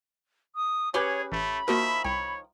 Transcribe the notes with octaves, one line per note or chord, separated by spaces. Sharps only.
D#6
C#4 G4 G#4 B4 C#5
A1 A3 B5
D#3 F3 A#3 F#4 A#4 E5
C2 C#5 G5